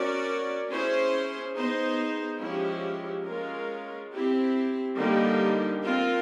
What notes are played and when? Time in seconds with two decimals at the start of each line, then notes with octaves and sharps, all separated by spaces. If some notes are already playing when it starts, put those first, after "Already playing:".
Already playing: C#4 F#4 A#4 D5
0.69 C#4 E4 G#4 C5
1.54 B3 D#4 G#4 C5
2.40 F3 G#3 C#4 E4 G4
3.25 G#3 C#4 F4 A#4
4.11 C4 E4 G4
4.96 D3 G3 A#3 D#4 G4
5.81 C4 F4 A#4